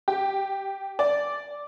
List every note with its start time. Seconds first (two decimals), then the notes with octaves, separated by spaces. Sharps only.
0.08 G4
0.99 D5